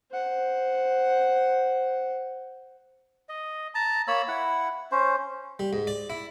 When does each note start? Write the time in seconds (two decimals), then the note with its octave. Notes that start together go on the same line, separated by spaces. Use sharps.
0.12 C5 F#5
3.29 D#5
3.75 A5 A#5
4.08 A#3 C#5 B5 E6
4.28 E4 F#5
4.92 C#4 C5
5.59 G3
5.73 G#2
5.87 D5
6.10 E4